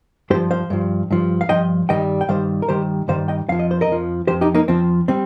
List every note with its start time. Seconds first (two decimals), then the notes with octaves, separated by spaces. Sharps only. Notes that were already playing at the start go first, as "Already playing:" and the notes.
0.30 G2 G4 C5
0.35 F3
0.51 C5 F5
0.70 G2 F3
1.11 G2 F3
1.41 F5
1.49 G2 F3 D#5 G5
1.89 G2 D#3 G3 D#5 G5
2.21 G5
2.29 G2 D#3 G3 C5 F5
2.62 A#4
2.69 G2 D#3 G3 G4 C5
3.08 G2 D#3 G3 C5 F5
3.28 D#5 G5
3.49 F2 F3 F5
3.59 D#5
3.71 C5
3.81 A#4 D#5
3.88 F2 F3
4.27 F2 F3 G4 C5
4.41 D#4 G4
4.55 A#3 D#4
4.68 F2 F3 C4
5.08 G3 C4